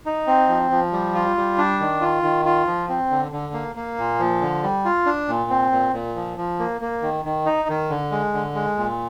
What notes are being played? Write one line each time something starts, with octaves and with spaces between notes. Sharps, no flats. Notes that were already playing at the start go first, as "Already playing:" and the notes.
D#4
C4
F3
F3
G3
F4
G3
D4
D#3
F4
D#3
F4
F3
C4
D3
D3
A#3
A#3
A#2
F3
D3
G3
F4
D4
A#2
C4
A#2
A#2
F3
F3
A#3
A#3
D#3
D#3
D#4
D#3
D3
G#3
D3
G#3
A#2